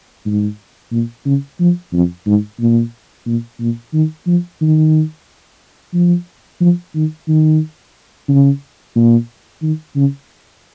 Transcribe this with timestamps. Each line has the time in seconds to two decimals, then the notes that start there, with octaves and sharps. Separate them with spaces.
0.26 G#2
0.92 A#2
1.25 C#3
1.60 F3
1.93 F2
2.26 G#2
2.60 A#2
3.26 A#2
3.60 A#2
3.94 D#3
4.27 F3
4.61 D#3
5.94 F3
6.61 F3
6.95 D#3
7.28 D#3
8.29 C#3
8.96 A#2
9.62 D#3
9.96 C#3